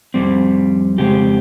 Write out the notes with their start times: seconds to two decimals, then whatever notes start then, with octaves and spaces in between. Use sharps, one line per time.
0.14 F2 C#3 G3 C4
0.98 F2 C#3 G#3 C4 G4